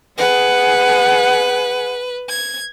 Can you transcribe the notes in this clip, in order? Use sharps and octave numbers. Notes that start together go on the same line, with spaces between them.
G#4 B4 F#5
G#6